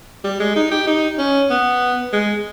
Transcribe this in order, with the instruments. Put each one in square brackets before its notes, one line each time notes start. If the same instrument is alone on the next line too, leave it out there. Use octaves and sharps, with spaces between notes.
[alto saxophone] G3
G#3
D#4
G4
D#4
C#4
B3
G#3